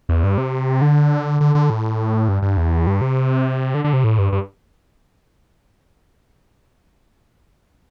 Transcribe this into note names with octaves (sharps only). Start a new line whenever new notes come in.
E2
G2
C3
D3
D3
D3
A2
G2
G2
E2
G2
C3
D3
D3
C3
A2
G2
G2